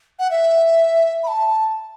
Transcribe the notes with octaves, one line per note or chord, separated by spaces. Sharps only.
F#5
E5
B5
A5